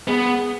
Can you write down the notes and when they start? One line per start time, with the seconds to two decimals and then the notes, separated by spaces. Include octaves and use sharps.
0.08 B3 G#4